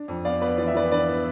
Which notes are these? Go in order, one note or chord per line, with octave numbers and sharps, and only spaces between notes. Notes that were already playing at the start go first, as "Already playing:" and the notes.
Already playing: D4
F2
B3 D5 F5
B3 B4 D5
E3 D5
E5
E3 B4 D5
D4 B4 D5
B3